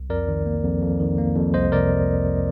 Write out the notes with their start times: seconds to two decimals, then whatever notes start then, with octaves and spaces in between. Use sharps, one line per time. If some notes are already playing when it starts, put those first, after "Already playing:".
Already playing: C2
0.10 F2 A#4 D5
0.28 D#3
0.46 A#3
0.64 F2
0.82 F2
1.00 D#3
1.18 A#3
1.36 F2
1.54 C2 C5 D#5
1.72 C3 A#4 D5